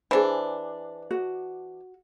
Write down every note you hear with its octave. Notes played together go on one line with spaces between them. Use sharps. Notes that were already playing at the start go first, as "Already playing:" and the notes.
E3 D4 G#4 C5
F#4